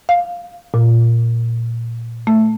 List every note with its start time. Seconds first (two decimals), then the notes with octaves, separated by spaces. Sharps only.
0.09 F5
0.74 A#2
2.27 A3